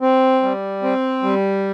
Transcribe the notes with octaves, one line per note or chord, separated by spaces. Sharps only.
C4
G3
C4
G3